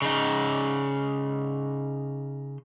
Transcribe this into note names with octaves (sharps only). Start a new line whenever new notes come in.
C#3 D#4